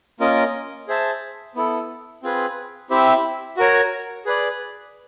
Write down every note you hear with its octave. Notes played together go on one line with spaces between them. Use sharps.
A#3 C#4 F4 A#4 D#5
G#4 C5 E5 A5
B3 E4 A4
C4 F4 G#4 B4
C4 E4 G4 C5 E5
F#4 A#4 C#5
G#4 B4 D5